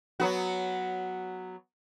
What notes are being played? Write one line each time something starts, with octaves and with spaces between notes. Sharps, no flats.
F#3 B3 F#4